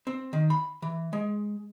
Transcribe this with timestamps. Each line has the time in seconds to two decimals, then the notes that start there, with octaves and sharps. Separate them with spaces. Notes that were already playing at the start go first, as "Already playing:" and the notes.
0.07 C4
0.33 D#3
0.50 B5
0.82 E3
1.13 G#3